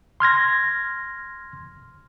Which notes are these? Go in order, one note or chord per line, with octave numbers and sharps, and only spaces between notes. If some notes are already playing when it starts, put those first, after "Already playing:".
C6 F6 G#6 A#6